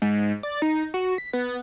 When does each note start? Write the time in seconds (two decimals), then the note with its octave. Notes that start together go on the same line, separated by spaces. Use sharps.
0.02 G#2
0.43 D5
0.62 D#4
0.94 F#4
1.18 B6
1.33 B3